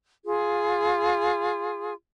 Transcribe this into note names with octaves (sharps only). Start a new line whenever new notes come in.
F4 G#4